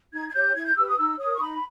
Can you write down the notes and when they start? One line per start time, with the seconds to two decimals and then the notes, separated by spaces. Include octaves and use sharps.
0.12 D#4 G#6
0.29 G#6
0.33 G4 C#5 G6
0.54 E4 G#6
0.65 G6
0.76 G4 B4 E6
0.87 D#6
0.97 D#4 E6
1.18 A#4 C#5 D#6
1.35 C#6
1.40 D#4 B5